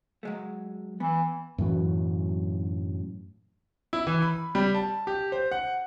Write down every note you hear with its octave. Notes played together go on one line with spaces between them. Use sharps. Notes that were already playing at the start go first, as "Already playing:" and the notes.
F#3 G#3 A3
E3 B3
F#2 A2 E3 F#3
E4
E3
B5
G3
A5
G4
C5
F#5